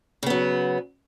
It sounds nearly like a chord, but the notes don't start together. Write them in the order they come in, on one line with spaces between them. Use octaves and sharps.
C#3 B3 F#3